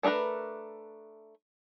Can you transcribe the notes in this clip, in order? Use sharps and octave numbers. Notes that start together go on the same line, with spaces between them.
A3 D4 G#4 A#4 B4